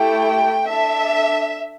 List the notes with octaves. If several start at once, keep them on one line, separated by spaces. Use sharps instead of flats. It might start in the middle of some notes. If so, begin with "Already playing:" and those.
Already playing: A3 E4 G4 G5
D4 A4 E5